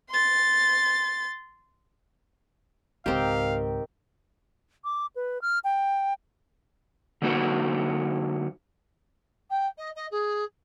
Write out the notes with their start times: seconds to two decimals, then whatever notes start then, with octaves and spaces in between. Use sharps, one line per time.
0.11 C6 A6
3.06 C#2 G#2 D#3 C4 G4 F5
4.84 D6
5.16 B4
5.42 F6
5.64 G5
7.22 D3 F#3 A#3 D#4 F#4 B4
9.50 G5
9.77 D#5
9.95 D#5
10.11 G#4